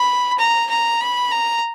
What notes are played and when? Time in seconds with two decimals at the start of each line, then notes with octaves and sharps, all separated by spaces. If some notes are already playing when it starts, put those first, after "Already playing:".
Already playing: B5
0.38 A#5
0.70 A#5
1.01 B5
1.32 A#5